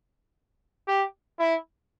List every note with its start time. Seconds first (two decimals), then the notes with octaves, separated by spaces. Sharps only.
0.88 G4
1.39 E4